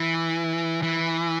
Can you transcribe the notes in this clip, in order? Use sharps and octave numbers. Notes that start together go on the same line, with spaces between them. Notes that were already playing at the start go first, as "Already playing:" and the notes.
Already playing: E3
E3